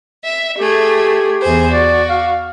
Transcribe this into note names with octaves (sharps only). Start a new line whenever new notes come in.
E5
A3 G4 G#4
E2 G#4 C5
F#4 D5
F5